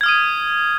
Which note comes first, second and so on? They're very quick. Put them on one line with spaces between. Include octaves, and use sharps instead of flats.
G#6 F6 D#6 D#7